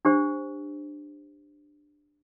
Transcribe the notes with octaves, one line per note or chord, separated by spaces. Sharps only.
D4 G4 C5